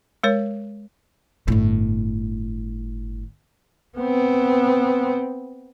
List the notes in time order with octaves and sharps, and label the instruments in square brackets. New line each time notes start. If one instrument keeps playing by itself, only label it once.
[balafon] G#3 A#4 C#5
[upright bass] G1 A2
[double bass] B3 C4